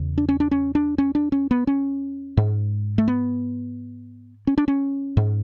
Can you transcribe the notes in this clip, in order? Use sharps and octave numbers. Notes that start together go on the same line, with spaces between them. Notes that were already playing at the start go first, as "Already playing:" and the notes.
Already playing: E2 C#3
D4
C#4
D4
C#4
D4
C#4
D4
C#4
B3
C#4
G#2
A3
B3
C#4
D4
C#4
G#2